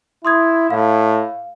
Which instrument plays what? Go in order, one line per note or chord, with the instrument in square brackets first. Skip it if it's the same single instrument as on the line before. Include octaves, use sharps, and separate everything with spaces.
[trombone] E4 [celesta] C6 D#6 G#6
[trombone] A2 [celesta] F5